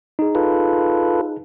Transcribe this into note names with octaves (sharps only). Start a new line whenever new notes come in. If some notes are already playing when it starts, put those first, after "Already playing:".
D#4 G#4
F4 A4 B4